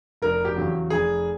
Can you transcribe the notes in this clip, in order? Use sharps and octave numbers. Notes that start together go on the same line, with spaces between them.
F1 A#4
G4
E2 C#3 F#3
F1 G#4